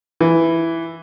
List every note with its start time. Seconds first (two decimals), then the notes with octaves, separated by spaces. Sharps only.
0.21 E3